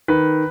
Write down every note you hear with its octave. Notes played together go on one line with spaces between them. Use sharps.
D#3 B4